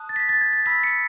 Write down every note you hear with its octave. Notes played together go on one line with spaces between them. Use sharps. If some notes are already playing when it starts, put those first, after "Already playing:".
Already playing: A5 D#6 F#6
A6
B6
A6
G#6
A6
B5 E6 B6
C#7